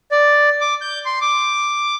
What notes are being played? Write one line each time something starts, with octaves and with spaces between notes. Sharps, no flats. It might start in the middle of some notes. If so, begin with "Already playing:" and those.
D5
D6
G6
C6
D6